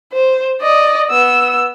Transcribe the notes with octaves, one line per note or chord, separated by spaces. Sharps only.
C5
D5 D#5
B3 E6